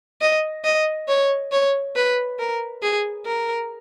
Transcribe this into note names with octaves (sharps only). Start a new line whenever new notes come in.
D#5
D#5
C#5
C#5
B4
A#4
G#4
A#4